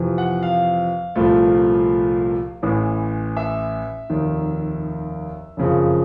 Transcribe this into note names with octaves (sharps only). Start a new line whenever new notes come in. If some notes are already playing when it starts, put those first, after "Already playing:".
Already playing: F2 C3 E3
F#5
F5
C2 A#2 F3 A3
A1 A2 E3
E5
F1 D#2 D#3
F#1 F2 C#3 F3